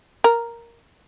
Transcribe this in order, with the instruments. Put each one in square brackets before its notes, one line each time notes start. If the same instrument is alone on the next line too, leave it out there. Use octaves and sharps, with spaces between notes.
[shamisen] A#4